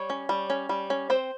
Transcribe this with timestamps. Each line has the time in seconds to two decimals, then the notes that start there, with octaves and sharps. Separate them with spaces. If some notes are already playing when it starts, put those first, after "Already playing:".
Already playing: G3 C#5
0.10 C#4
0.29 G3
0.50 C#4
0.69 G3
0.90 C#4
1.10 C4 C5